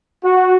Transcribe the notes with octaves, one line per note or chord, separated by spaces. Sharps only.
F#4